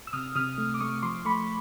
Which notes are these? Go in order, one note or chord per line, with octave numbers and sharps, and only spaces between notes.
E6
C3 D#6 F6
C3 D#6 F6
A3
D6
A3 C#6 D#6
F3 C6 D6
A3 B5 C#6